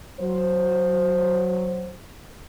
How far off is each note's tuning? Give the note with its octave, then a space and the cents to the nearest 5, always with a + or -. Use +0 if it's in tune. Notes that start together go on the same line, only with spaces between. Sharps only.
F#3 +0 C5 +0